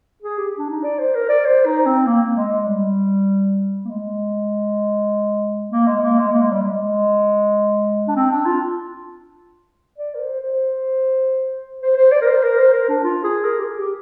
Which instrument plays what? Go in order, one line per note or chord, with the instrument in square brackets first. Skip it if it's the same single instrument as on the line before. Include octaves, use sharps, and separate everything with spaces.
[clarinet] G#4
G4
D4
D#4
D5
C5
A#4
D5
C5
D#4
C4
A#3
A#3
G#3
G#3
G3
A#3
G#3
A#3
G#3
A#3
G#3
A#3
G#3
G3
G#3
D4
C4
D4
F4
D5
A#4
C5
C5
C5
C5
D5
A#4
C5
A#4
C5
A#4
D4
F4
G#4
A#4
G4
G#4
G4